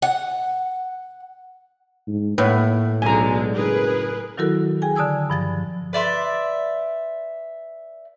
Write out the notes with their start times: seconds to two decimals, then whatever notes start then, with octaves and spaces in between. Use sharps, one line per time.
0.02 F#5
2.07 G#2
2.38 A2 A#3 B4 C#5 F#5
3.02 B1 D3 G#3 G#5 A#5
3.54 F#1 G#4 A#4 B4
4.37 D#3 F#3 E4 F#4 A4 A#4
4.82 G#4 G5 G#5
4.95 D3 D5 A5 D#6 E6 G#6
5.30 G2 F3 A6
5.93 B4 D5 E5 C6